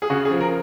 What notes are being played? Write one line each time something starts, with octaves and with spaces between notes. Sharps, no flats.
G#4
C#3 F#4
G#4
F3
A#4